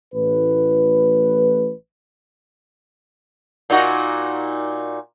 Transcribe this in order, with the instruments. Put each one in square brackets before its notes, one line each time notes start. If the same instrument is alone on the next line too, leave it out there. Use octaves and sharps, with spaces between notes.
[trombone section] A1 A2 B4
[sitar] A#2 D#4 F#4